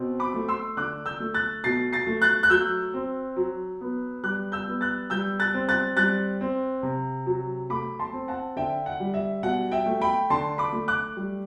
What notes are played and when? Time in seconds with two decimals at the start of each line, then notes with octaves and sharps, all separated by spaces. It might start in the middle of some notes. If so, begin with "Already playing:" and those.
Already playing: B2 C4
0.20 B5 D6
0.34 A3
0.49 C6 E6
0.77 D3 D6 F#6
1.06 E6 G6
1.20 A3
1.34 F#6 A6
1.64 B2 A6 C7
1.93 A6 C7
2.07 A3
2.22 F#6 A6
2.43 F#6
2.50 F#3 E6 G6
2.94 C4
3.36 F#3
3.81 B3
4.24 G3 D6 F#6
4.52 E6 G6
4.68 B3
4.81 F#6 A6
5.10 G3 E6 G6
5.39 F#6 A6
5.54 C4
5.69 F#6 A6
5.97 G3 F#6 A6
6.41 C4
6.83 C3
7.26 F#3
7.70 A3 B5 D6
7.99 A5 C6
8.13 C4
8.28 F#5 A5
8.56 D3 E5 G5
8.86 F#5
9.00 G3
9.14 E5
9.43 B2 F#5
9.71 E5 G5
9.86 A3
10.02 G5 B5
10.30 D3 A5 C6
10.58 B5 D6
10.73 A3
10.88 D6 F#6
11.17 G3